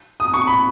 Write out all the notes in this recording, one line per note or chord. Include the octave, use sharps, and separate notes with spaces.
D#6
C#6
B5